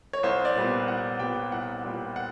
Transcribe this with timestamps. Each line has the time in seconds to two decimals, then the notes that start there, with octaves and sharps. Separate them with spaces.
0.13 C#5
0.23 C2 C5
0.45 D5
0.56 A#2 G3 B3
0.88 C2 F#5
1.19 A#2 G3 B3 G5
1.52 C2 F#5
1.84 A#2 G3 B3
2.16 F#5